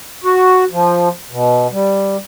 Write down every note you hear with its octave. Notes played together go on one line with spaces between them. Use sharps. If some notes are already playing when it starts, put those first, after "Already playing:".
F#4
F3
B2
G3